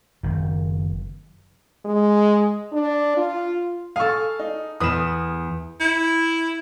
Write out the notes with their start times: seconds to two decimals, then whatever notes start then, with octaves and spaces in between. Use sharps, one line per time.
0.23 F#1 D#3
1.85 G#3
2.72 D4
3.17 F4
3.96 G#4 A4 F5 C#6
4.39 D#4
4.80 E2 B4 D#6 E7
5.80 E4